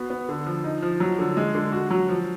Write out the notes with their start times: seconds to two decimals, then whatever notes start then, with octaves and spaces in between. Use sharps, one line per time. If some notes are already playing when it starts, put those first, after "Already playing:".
Already playing: B3 F#4
0.10 B3
0.29 D3
0.46 F3
0.64 D#4
0.82 F3
1.00 F#3
1.19 D3
1.37 G#3
1.55 D3
1.72 F#4
1.91 F#3
2.09 F3